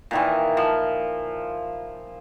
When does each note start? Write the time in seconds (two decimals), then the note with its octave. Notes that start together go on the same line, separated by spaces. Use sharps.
0.11 A#2 D#3 E3
0.57 F3